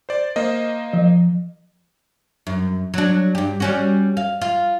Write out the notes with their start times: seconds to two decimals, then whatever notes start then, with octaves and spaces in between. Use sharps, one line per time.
0.09 C5 D5
0.36 A#3 C5 D#5
0.93 F3
2.47 F#2
2.94 F#3 D4
3.35 G2 G4
3.60 G3 C#4 F#4
4.17 F5
4.41 F4